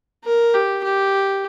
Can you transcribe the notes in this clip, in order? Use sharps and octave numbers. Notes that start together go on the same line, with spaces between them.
A#4
G4
G4